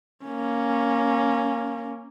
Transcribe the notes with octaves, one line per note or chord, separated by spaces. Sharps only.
A#3 C#4